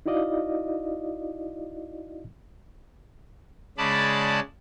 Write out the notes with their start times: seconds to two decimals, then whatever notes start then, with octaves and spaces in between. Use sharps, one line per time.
0.06 D#4 E4 F#4 D5 D#5 F5
3.78 C#3 G#3 D5 A5 B5